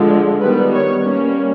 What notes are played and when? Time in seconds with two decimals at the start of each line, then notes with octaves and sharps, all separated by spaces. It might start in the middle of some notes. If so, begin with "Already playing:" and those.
Already playing: D3 F3 G#3
0.41 D#3 G3 B3 B4
0.72 C#5
1.02 G3 A#3 C#4